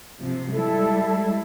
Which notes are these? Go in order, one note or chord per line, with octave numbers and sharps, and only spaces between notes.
C3 F3
G3 G#3 E4 A4